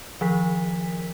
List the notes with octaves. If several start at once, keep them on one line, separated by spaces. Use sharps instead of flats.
D#3 F3 B6